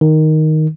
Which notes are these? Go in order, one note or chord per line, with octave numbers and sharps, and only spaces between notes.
D#3